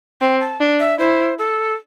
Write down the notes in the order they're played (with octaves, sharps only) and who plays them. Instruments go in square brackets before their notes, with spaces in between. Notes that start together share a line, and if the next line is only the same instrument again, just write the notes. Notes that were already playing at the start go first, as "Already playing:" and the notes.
[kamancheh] C4 [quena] G5
[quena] A5
[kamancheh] D4
[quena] E5
[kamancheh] E4 [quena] C5
[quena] A4